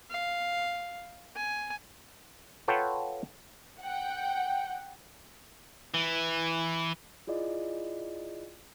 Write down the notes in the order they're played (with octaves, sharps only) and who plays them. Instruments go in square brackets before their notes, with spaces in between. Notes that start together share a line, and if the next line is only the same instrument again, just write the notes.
[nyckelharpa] F5
G#5
[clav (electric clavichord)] F4 A4 B4 C#5 F#5 G5
[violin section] F#5 G5
[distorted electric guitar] E3
[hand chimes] E4 F4 G#4 D5 D#5